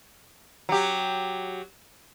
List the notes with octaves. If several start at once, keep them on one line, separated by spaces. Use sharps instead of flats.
F#3 G4